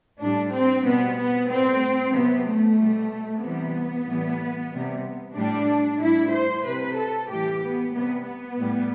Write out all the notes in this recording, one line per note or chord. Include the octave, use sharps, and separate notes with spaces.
A2 G3 D4
C4
B2 G3 B3
B3
A2 G3 C4
C3 F#3 B3
A3
B2 G3
C3 E3 G3 B3
A2 E3 G3
C3 G3
A2 G3 D4
A2 G3 E4
C5
C3 G3 B4
A4
A2 E3 G3 G4
B3
C3 G3 B3
B3
A2 G3